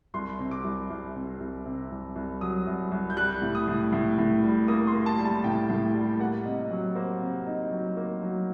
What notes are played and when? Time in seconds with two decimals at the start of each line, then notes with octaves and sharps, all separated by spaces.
0.14 C2 C6
0.39 C3
0.51 D6
0.64 C2
0.90 C2
1.15 C3
1.40 C2
1.65 C3
1.91 C2
2.16 C2
2.41 F#3 D#6
2.67 C2
2.91 C2
3.10 G6
3.17 G3 F#6
3.42 A2
3.55 D#6
3.68 A2
3.92 A2
4.18 A2
4.43 G3
4.68 A#3 D#6
4.87 C6
4.94 A#3
5.06 A5
5.19 G3
5.25 A5
5.44 A2 G5
5.70 A2
5.94 G3
6.20 A#3 F#5
6.45 C3 D#5
6.70 F#3
6.95 A#3 C5
7.21 C3
7.47 D#4
7.72 F#3
7.97 A#3
8.23 F#3